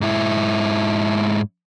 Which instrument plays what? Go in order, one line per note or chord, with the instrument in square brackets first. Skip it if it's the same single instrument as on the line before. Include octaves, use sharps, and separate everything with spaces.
[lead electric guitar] G#2 E4